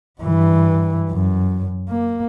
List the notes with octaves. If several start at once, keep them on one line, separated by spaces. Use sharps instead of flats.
G2 E3
F#2
A#3